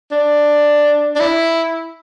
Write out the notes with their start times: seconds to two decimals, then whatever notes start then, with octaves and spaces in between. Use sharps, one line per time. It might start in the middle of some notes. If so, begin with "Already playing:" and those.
0.12 D4
1.16 D4
1.20 E4